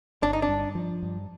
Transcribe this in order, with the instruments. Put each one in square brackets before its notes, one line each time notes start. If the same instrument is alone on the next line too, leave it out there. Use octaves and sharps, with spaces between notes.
[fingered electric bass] G1 [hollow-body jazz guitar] D4
[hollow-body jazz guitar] D#4
D4
[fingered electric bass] G2
F3
G2